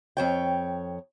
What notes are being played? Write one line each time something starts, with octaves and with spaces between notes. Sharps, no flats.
F2 C#5 G5